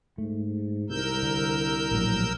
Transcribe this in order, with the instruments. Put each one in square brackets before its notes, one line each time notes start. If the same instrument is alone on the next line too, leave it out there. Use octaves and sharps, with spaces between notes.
[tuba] G#2 [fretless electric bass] A3
[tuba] C2 [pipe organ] A#4 E6 G6
[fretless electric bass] D3
A#1 A2 F#3